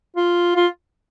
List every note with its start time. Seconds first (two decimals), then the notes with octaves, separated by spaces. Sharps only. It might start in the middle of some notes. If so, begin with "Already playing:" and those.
0.16 F4
0.56 F4